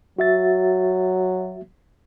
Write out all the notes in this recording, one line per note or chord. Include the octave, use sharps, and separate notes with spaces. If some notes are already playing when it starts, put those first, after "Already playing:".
F#3 F#4 E5 A6